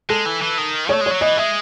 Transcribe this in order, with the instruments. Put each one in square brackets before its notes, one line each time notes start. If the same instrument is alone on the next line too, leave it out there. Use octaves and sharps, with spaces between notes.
[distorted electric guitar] G#3 [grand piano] A4
[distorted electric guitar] E3
E3
D#3
[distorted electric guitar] A3 [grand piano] C#5
[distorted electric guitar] G#3
[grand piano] C#5
[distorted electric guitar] F#3
[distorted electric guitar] E3 [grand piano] D#5
[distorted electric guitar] G#3 [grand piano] E5